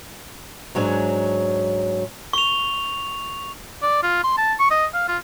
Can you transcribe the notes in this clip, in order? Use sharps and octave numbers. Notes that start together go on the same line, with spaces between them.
G#2 F#3 G#3 D4
C#6 F7
D5
F4
C6
A5
C#6
D#5
F5
F4